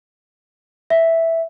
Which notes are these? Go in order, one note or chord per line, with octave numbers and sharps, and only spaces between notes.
E5